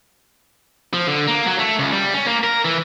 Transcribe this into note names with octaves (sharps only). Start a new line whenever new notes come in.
F3
D3
A#3
F#3
A3
C#2
G3
C#4
A#3
A#4
E3